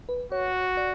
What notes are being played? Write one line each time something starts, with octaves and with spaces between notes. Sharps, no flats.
B4
F#4 C#5
D5